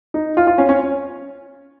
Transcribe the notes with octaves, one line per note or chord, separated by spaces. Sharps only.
D#4
F4
F4
C#4
C#4